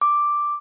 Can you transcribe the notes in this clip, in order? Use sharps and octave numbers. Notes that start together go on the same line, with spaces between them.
D6